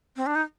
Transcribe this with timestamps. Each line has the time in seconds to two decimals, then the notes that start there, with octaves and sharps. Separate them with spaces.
0.16 C4
0.26 D4
0.35 D#4